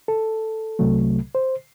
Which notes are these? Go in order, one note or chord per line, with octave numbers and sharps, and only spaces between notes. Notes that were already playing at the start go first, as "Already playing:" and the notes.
A4
C2 C3 F#3 A3
C5